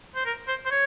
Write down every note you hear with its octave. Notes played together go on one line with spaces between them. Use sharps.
C5
A#4
C5
C5
C#5